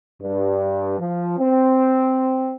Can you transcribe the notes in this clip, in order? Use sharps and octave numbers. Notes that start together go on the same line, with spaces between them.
G2
F3
C4